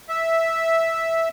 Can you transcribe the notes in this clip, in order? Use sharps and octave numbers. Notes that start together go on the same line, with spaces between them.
E5